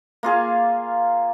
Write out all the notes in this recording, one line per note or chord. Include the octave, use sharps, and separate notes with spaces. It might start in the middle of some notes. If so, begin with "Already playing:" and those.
A#3 F4 G#4 F5